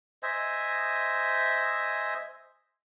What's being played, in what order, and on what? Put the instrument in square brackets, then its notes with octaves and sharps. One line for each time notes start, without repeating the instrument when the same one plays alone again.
[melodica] C5 D#5 E5 G#5